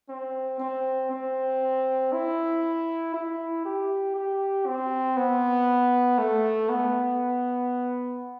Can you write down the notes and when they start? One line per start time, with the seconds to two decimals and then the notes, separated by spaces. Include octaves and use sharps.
0.09 C4
0.60 C4
1.11 C4
2.12 E4
3.14 E4
3.65 G4
4.15 G4
4.66 C4
5.17 B3
6.18 A3
6.69 B3